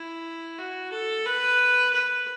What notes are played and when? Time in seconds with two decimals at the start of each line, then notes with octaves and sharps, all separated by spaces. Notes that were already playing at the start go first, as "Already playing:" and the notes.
Already playing: E4
0.58 F#4
0.92 A4
1.26 B4
1.93 B4